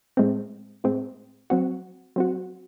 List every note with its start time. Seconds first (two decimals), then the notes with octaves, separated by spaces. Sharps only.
0.17 A2 G#3 C4
0.84 A2 G#3 C4
1.50 F#3 C4 F#4
2.16 F#3 C4 F#4